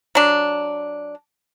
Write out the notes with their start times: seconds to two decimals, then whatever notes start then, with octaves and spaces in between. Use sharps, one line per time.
0.15 F#3 D4